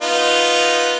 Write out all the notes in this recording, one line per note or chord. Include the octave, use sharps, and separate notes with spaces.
B3 D#4 F4